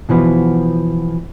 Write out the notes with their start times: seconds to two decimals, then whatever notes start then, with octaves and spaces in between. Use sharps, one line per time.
0.09 B2 E3 F3 B3